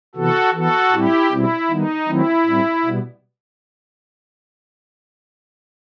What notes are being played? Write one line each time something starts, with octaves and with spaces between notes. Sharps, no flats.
C3 E3 B3 F#4 A4
E3 B3 F#4 A4
A2 G3 C4 E4 G4
B2 G3 C4 E4
D#3 G3 B3 D#4
D#3 F#3 A3 C4 E4
A2 G3 C4
B2 G3 B3